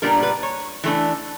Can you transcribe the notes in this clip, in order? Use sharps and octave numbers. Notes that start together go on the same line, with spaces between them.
A#2 G3 B3 D4 A#4
B4
C#5
E3 A3 D4